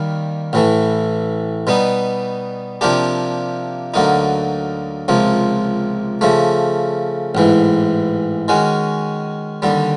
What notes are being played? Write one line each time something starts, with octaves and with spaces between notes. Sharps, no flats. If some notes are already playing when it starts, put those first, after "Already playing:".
Already playing: D#2 D#3 G3 A#3
A1 A2 E3 A3
B2 G3 B3 D#4
C3 F3 A#3 D4 G4
D2 D3 F#3 A#3 D#4
C#2 C3 F3 A#3
C#3 F3 A3
A1 G#2 E3
D#3 G#3 C#4 F#4
D#2 D3 G3